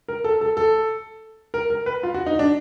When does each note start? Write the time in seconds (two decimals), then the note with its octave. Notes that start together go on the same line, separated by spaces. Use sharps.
0.08 A#4
0.24 A4
0.41 A4
0.57 A4
1.54 A#4
1.70 A#4
1.86 B4
2.03 F4
2.14 F#4
2.26 D#4
2.39 D4